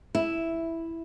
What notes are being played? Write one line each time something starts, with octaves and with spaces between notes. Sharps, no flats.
E4